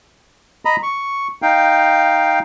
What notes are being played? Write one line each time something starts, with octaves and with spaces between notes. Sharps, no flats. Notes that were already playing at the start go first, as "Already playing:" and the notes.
D#5 A#5 B5
C#6
D#4 F5 G5